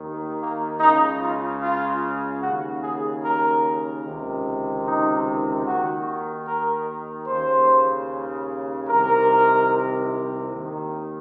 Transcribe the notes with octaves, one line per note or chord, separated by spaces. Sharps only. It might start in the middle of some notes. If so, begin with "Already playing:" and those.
Already playing: D#2 D#3
A#3
C#2 C#3 D#4
F4
F4
D#2 C#3 F#4
G#4
A#4
C#2 C3 D#3
D#4
D#2 D#3 F#4
A#4
D#2 C#3 C5
C2 C3 D#3 A#4
D#2 D#3